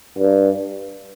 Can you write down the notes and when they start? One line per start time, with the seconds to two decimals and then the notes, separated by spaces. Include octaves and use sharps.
0.18 G2